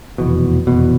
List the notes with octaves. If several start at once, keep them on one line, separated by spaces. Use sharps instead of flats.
F1 E2 B2
F1 E2 B2